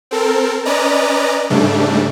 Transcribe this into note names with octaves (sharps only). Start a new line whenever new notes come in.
C4 A4 A#4
C#4 B4 D5 D#5 A#5
G#2 C#3 G3 A3 D4